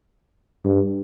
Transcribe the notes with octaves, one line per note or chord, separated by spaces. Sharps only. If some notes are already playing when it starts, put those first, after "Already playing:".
G2